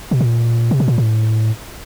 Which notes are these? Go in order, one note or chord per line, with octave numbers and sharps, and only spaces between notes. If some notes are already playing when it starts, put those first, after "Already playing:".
B2
A#2
C3
B2
A#2
A2